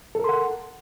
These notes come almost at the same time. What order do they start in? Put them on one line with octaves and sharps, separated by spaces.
A4 A#4 C6 F#5